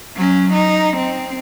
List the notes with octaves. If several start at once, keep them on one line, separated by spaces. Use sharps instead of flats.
F#3 C#4
D#4
C4